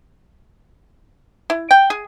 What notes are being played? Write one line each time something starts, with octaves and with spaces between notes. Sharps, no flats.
E4
G5
G#4